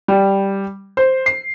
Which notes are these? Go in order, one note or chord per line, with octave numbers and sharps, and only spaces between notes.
G3
C5
C7